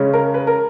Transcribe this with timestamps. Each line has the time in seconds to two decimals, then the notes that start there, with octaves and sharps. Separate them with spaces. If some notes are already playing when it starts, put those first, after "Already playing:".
Already playing: C#3 G#3 C#4
0.13 A#4
0.34 B4
0.47 A#4